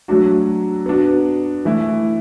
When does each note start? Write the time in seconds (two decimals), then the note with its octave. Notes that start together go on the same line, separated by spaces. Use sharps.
0.08 F#3 A3 D4 F#4
0.86 B3 D4 F#4
1.65 E3 A3 E4